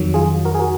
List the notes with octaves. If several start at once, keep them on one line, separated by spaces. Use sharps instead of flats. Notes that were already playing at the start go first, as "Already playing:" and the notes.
Already playing: F2 D#3 F#3
F4 G#4
F#4 A#4
G#4
F#4 A#4